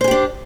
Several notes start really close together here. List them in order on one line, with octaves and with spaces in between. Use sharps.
C5 G#4 G4 D4